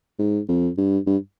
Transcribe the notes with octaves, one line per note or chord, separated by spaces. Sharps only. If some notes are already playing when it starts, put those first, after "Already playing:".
G#2
F2
G2
G2